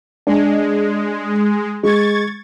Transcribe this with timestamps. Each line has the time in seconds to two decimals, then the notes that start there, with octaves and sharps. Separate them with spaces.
0.27 G#3 D4
1.83 G#3 C#6 G#6 A6